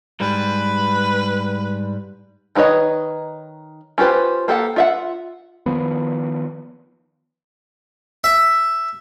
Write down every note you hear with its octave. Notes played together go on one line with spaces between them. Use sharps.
G#2 G3 B4
D#3 D#4 B4 C#5 D#5
C#4 F4 G4 B4 C5
A#3 G4 A4 D5 F#5
F4 E5 F#5
D#3 F3 B3
E5